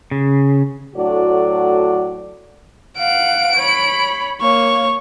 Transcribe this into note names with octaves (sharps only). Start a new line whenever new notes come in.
C#3
A2 F#3 D4 F#4 A4 D5
F5 F#5 D7
C#5 B5
A#3 C#5 C#6